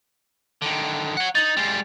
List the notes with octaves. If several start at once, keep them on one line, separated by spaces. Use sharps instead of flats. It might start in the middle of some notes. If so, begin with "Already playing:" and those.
D3 D#3
C#5 F#5
D#4 A6 F#7
G3 G#3